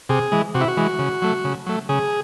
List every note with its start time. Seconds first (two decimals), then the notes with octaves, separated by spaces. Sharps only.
0.09 C3 G#4
0.32 E3 G#3
0.55 C3 F#4
0.61 E4
0.68 F#4
0.77 E3 G#3
0.99 C#3
1.22 F#3 A3
1.45 C#3
1.66 F#3 A3
1.89 C#3 G#4